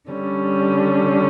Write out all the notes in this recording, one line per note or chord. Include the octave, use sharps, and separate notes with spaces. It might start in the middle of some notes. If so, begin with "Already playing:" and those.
D3 G3 C#4